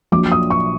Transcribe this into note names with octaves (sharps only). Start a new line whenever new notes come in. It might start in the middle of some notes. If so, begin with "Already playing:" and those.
A#1 A#2 F#3 D6
D#6
C#6